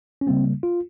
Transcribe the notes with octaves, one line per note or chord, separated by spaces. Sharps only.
C#4
C#3 G3 A#3 C4
F4